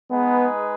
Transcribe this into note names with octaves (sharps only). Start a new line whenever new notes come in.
G#3 B3 D#4 G#4 B4